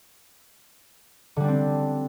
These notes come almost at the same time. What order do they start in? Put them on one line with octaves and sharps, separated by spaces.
D3 G3 D4 C4